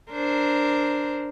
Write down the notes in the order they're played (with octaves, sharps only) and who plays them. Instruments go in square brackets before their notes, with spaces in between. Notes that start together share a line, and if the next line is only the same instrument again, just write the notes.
[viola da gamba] D4 A#4 C5